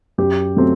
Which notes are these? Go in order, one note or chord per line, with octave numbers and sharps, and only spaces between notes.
F#2 G4
F#3 A3 C4